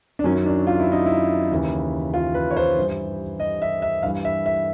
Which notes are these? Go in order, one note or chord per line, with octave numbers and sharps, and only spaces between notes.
D4
F#2 D#3 F#3 C#4
D4
F4
E4
D#4
E4
D#2 C#3 E3
F4
B4
C#5
C5
G2 E3
D#5
E5
E5
G2 E3 F5
E5
E5